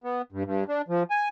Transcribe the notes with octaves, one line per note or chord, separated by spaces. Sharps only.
B3
G2
G2
D4
F3
G#5